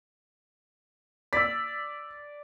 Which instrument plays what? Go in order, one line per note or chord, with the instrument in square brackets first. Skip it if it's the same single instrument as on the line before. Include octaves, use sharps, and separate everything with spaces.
[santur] D5 [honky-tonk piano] E6 B6